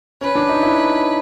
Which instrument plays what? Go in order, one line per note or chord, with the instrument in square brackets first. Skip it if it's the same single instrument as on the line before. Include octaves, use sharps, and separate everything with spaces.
[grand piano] C#4 [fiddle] B4
[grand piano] D4
D#4
E4